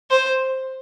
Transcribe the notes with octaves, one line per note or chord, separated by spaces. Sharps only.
C5